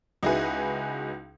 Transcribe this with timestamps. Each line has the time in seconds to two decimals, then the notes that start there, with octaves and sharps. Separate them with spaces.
0.23 C#2 D#4 E4 F#4 G#4 B4